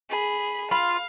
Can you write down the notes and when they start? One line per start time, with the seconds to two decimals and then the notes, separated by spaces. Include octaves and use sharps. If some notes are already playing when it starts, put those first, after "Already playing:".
0.10 G#4 B5
0.71 F4 F5 B5